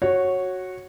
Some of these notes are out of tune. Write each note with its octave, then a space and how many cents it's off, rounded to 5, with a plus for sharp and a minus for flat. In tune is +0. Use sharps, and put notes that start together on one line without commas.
F#4 +0 C#5 -15